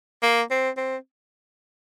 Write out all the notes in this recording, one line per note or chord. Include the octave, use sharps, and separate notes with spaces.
A#3
C4
C4